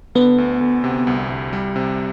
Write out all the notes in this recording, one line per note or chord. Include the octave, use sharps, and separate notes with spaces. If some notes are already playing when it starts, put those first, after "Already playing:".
D3 B3
D2
D2
C3
C2
C2
G3
C3